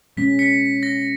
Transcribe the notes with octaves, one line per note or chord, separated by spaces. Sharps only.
B2 G#3 C#4 B6
B6 C#7
A#6